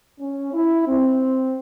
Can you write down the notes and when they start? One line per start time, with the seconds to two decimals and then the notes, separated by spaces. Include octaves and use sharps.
0.20 C#4
0.53 E4
0.86 C4